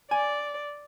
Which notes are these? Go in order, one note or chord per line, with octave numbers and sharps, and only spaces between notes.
D5 G#5